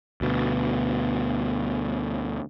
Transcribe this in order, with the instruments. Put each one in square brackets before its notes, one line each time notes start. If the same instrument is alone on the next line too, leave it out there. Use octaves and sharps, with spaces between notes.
[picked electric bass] D2 B2